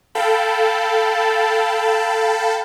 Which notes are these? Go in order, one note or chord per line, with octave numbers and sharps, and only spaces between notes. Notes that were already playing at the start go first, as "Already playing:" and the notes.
A4 F5 G5 A5 B5